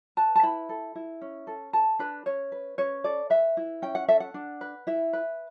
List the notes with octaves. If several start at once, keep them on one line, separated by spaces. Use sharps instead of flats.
B4 A5
A5
E4 B5
A4
E4
C#4
A4
A4 A5
D4 B4
C#4 C#5
B4
C#4 C#5
A4 D5
B4 E5
E4
C#4 G5
F#5
A4 E5
F#5
D4
B4
E4 E5
B4